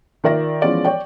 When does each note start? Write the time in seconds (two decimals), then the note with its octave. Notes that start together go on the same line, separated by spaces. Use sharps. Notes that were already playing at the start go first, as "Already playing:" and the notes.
0.24 D#3 F4 A#4 D5 E5 A#6
0.62 E3 F3 G#3 B3 C#4 D5
0.85 C#5 D5 G5